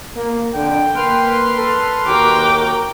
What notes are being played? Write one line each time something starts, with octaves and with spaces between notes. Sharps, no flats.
A#3
F2 D3 G5
A#3 B4 C6 F6
A4
D#2 F#4 A#4 G5 D6